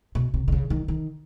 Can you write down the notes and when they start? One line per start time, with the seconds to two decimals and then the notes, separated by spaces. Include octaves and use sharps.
0.15 B2
0.34 C3
0.48 D3
0.52 C#3
0.70 D#3
0.88 D#3